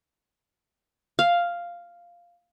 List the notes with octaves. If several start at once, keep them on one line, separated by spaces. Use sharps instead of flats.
F5